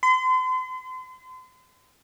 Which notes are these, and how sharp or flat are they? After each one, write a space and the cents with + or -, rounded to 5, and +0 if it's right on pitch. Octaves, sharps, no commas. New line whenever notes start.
C6 -40